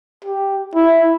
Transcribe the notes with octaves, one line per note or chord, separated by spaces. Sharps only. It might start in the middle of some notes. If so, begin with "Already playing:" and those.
G4
E4